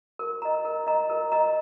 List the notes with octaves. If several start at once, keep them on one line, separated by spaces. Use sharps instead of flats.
A#4
D#5 A#5
A#4
D#5 A#5
A#4
D#5 A#5